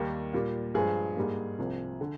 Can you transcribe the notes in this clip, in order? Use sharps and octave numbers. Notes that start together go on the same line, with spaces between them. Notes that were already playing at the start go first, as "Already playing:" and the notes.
Already playing: D#2 D#3 G3 A#3
A#2 G3 A#3
G2 F3 G#3 G#4
G#2 G3 A#3
C2 C3 F3
D3